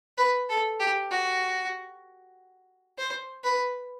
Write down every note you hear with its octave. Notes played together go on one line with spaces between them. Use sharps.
B4
A4
G4
F#4
C5
B4